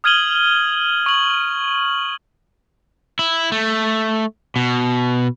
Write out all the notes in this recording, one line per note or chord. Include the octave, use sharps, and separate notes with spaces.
D#6 F6 G#6 D#7 F#7 G7
C#6 F#7
E4
A3
B2